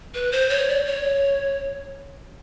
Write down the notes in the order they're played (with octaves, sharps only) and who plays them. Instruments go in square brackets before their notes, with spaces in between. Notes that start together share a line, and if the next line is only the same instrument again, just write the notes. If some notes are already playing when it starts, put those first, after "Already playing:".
[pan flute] B4
C5
C#5
D5
C#5